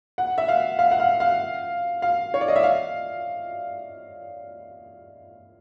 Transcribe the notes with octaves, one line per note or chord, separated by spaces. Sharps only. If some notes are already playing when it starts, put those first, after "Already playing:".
F#5
E5
F5
F5
F#5
F5
F5
F5
C#5
D5
D#5
E5
F5